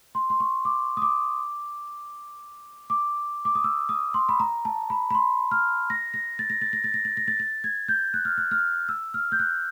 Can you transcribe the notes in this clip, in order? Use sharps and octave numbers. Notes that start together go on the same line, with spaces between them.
C6
C6
C#6
D6
D#6
D6
D6
D6
D#6
E6
D#6
C6
B5
A#5
A5
B5
B5
C6
F6
A#6
A#6
A6
A#6
A6
A#6
A6
A#6
A6
A#6
A6
A6
G#6
G6
F#6
F6
F#6
F6
E6
F6
G6
F#6